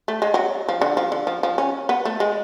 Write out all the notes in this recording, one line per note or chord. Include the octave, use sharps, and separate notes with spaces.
A3
G#3
F#3
F3
D3
F3
D3
F3
F3
C#4
B3
A3
G#3